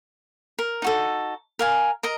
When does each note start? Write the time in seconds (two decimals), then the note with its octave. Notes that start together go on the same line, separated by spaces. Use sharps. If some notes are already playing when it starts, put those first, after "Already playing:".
0.59 A#4
0.82 D#4 F#4 A4
1.59 A#4 F5 G#5
2.03 A#4 D#5 A#5